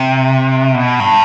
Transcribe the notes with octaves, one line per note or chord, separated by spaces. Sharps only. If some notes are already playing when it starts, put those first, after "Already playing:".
Already playing: C3
B2
G2